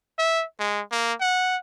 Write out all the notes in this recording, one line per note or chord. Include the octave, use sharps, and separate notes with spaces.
E5
G#3
A#3
F#5